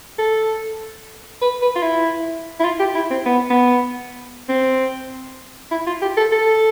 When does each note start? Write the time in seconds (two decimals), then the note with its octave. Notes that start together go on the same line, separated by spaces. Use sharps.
0.18 A4
1.42 B4
1.62 B4
1.75 F4
1.83 E4
2.60 E4
2.64 F4
2.80 G4
2.95 E4
3.11 C4
3.26 B3
3.50 B3
4.49 C4
5.71 E4
5.87 F4
6.02 G4
6.17 A4
6.32 A4